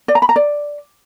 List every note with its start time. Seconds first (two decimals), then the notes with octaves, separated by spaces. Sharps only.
0.08 D5
0.15 A#5
0.22 B5
0.29 A#5
0.36 D5